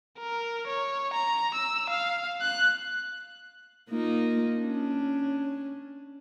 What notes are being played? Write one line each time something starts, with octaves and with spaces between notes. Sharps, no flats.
A#4
C#5
A#5
E6
F5
F#6
A#3 D#4 F4
C#4 D4